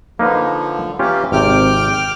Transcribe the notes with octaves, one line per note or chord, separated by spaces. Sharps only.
D3 F3 A#3 D#4 B4
E3 A#3 C#4 F4 G4
G#1 C3 G5 D6 F6